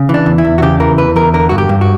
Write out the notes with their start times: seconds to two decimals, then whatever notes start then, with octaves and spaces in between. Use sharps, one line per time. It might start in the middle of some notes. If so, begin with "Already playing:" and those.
Already playing: C#3
0.09 E3 D4
0.26 E2
0.38 E4
0.45 E2
0.58 F#4
0.62 C#3 G4
0.80 E3 A#4
0.98 E2 B4
1.16 E2 A#4
1.34 D3 A#4
1.49 G2 F#4
1.58 G4
1.69 G2
1.81 F#4